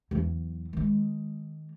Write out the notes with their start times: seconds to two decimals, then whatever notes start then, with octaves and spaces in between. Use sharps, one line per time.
0.11 E2 F#3
0.73 D#3 G#3